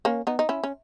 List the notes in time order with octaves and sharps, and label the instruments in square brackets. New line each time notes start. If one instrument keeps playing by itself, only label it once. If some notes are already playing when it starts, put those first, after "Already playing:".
[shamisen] A#3 C#4
B3 D#4
D#4
C#4 E4
C#4